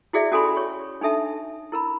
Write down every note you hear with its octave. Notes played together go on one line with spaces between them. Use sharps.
E4 F#4 G#4 D5 E5
C#4 F#4 A4 G#5 B5 C6
C#5 C#6
D4 D#4 A4 E5 A5
E4 A#4 B5